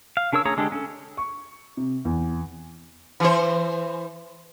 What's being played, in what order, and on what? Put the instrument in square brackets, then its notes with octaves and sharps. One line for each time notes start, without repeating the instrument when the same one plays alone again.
[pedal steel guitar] F5
C#3 D4 A#4 C#5 E6
A3 C#4 G#4 C#5 A#5
D3 G#3 D4 G4 A4
C#4 A4
[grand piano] C#6
C3
E2
[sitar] E3 C5